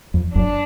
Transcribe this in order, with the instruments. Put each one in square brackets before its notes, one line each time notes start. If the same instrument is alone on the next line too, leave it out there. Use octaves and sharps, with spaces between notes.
[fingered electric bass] F2
[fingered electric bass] F#1 F#2 [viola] D4